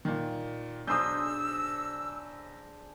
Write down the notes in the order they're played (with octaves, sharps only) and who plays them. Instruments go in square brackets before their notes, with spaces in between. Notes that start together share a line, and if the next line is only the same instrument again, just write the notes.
[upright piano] A#2 D#3
[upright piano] B1 [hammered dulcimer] D4 G#4 C5 [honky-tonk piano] D#6 G6 [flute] E6